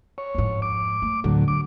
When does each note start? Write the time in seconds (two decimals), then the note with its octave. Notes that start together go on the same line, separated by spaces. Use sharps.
0.18 C#5
0.35 F2 G#2
0.62 D6
1.02 A3
1.24 D2 A2 D3 F#3
1.48 D6